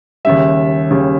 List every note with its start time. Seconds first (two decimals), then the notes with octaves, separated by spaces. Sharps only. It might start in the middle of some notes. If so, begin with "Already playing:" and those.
0.25 D#2 C#3 G3 E5
0.91 D#2 C#3 G3